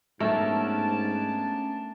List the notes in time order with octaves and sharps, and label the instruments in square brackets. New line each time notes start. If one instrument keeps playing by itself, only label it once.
[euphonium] G#2 [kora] A3 [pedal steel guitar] B3 C#4 A#4 [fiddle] D4 A5